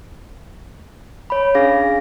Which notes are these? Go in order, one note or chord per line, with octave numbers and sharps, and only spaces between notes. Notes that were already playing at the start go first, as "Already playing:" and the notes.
C#5 B5
C#4 D4 G#4 F5 A#6